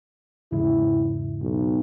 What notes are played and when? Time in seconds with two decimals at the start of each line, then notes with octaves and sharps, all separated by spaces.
0.52 E2 G#2 C#3 E4
1.42 B1